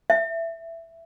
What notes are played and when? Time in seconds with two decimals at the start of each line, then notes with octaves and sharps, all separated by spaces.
0.10 E5